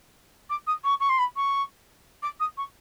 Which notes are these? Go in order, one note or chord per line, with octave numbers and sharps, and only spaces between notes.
D6
D#6
C#6
C#6
C6
B5
C#6
D6
D#6
C#6